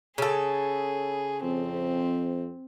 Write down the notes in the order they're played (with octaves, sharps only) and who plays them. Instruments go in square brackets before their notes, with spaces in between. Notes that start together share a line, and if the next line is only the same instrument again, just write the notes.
[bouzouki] C#3 A4 [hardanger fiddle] G#4
[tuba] F2 [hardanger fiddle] C4